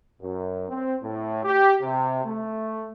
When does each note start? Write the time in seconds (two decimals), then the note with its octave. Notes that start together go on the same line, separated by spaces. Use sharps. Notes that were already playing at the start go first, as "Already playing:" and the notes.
0.21 F#2
0.69 C4
1.03 A2
1.45 G4
1.82 C3
2.25 A3